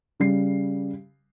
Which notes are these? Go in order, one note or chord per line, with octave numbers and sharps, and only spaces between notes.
C#3 G3 G4 C7